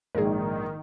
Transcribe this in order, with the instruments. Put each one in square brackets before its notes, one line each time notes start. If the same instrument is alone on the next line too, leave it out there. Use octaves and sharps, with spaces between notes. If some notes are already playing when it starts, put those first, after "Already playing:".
[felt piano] A#1 G#2 [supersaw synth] D#3 [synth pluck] G#4 A#4